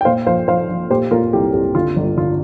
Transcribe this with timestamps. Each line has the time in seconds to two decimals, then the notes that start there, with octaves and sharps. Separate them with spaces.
0.01 G5
0.05 A#2 C5 F5
0.26 A#1 C5 F5
0.48 A#1 C5 F5
0.69 A#1
0.90 A#2 G4 C5
1.11 A#2 F4 A#4
1.33 C2 G4
1.53 C2 G4
1.75 D3 F4
1.96 G1
2.17 D3 F4